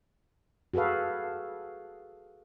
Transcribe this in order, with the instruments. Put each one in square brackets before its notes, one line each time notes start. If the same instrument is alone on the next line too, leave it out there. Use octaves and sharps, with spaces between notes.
[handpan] F#4 G#4 A4 B4 F5